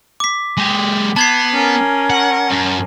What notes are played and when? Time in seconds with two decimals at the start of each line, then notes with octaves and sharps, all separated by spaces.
0.20 D6 B6
0.58 G#3 G4
1.16 B3 A5 G#6 C7
1.53 C#4 A#4
2.10 F#5
2.51 F#2